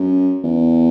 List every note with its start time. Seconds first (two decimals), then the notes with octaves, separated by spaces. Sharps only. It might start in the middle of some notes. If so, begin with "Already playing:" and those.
Already playing: F#2
0.44 E2